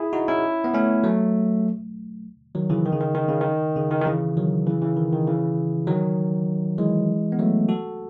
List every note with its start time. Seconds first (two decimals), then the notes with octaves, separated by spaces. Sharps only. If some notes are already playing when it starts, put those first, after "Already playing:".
Already playing: E4 G#4
0.13 D#4 F#4
0.28 C#4 E4
0.64 B3
0.74 A3 C#4
1.04 F#3 A3
2.55 D#3 F#3
2.70 C#3 E3
2.85 D#3
2.92 C#3
3.01 D#3
3.15 D#3
3.29 C#3
3.41 D#3
3.76 C#3
3.91 D#3
4.01 D#3
4.06 C#3 E3
4.37 D#3 F#3
4.67 C#3 E3
4.82 C#3 E3
4.97 D#3
5.12 D#3
5.27 C#3 E3
5.87 D#3 F#3
6.78 E3 G#3
7.32 B3
7.39 F#3 A3
7.69 F#4 A4